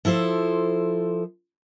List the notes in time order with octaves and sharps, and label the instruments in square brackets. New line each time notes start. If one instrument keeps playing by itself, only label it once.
[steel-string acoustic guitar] F3 E4 A4 C5